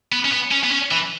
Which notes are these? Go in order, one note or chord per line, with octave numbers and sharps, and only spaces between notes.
B3
C#4
B3
C#4
B3
C#4
E3